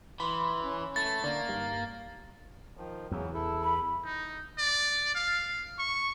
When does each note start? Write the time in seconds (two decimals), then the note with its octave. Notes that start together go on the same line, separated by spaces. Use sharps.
0.20 E3 B5 C6
0.62 C#4
0.96 A3 A6
1.24 D3 A#3 D5
1.49 G2 D#4
2.77 D#3 F3
3.11 E2 C#3 E3 F#3
3.34 E4 A4
3.62 B5
4.05 D#4
4.58 D5
5.15 F5
5.78 C#6